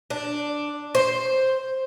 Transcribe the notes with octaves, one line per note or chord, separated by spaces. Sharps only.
D4
C5